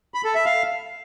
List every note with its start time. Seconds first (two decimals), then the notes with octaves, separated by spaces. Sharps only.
0.14 B5
0.24 A4
0.35 E5
0.45 F5